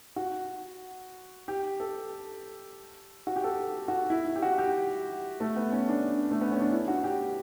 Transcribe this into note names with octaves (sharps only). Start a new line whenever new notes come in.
F#4
G4
A4
F#4
G4
A4
F#4
E4
E4
G4
F#4
G4
A3
B3
C#4
D4
A3
B3
C#4
D4
E4
F#4
G4